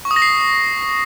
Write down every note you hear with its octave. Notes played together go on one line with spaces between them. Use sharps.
C#6
D#6
A#6
C7
D#6